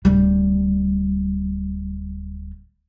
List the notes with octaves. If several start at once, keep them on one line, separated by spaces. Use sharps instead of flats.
D1 G3